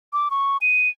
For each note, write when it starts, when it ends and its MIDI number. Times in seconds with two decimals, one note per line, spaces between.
0.13 0.29 86
0.31 0.57 85
0.61 0.89 99